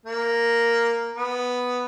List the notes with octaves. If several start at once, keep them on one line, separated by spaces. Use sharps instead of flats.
A#3
B3